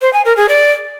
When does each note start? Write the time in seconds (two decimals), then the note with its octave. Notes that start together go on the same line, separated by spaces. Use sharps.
0.01 C5
0.13 G#5
0.25 A#4
0.37 G#4
0.49 D5